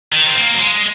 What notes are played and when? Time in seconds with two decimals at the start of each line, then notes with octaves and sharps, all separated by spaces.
0.12 D#3
0.27 C4
0.36 A#3
0.54 F#3
0.59 G#3